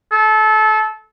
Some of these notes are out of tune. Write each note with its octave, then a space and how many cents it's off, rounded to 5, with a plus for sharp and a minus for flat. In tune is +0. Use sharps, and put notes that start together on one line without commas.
A4 -25